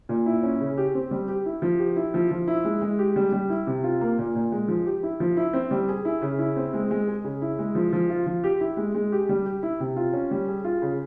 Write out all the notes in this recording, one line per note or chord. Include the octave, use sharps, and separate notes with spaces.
A#2
E4
C#4
C#3
G4
C4
G3
G4
E4
F3
G4
E4
F3
F3
E4
G#3
G#3
G4
G3
G3
E4
C3
F4
A#3
A#2
A#2
G#3
F3
G4
E4
F3
E4
C4
G3
G#4
E4
C#3
E4
C4
G#3
G#3
G#4
C#3
E4
G#3
F3
F3
F4
F3
G4
E4
G#3
G#3
G4
G3
G4
E4
C3
F4
C#4
G3
G#4
F4
C#3